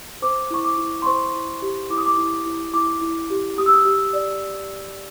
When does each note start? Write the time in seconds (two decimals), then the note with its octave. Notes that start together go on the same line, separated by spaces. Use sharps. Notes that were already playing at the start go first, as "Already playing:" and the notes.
0.22 C5 D6
0.51 E4 C#6
0.65 D6
0.78 E4
1.02 C6
1.06 C5 C#6
1.34 E4
1.62 G4
1.90 E4 D6
1.98 D#6
2.06 D6
2.17 E4
2.46 E4
2.74 E4 D6
3.02 E4
3.30 G4
3.58 G4 D#6
3.66 E6
3.74 D#6
3.85 G4
4.13 D5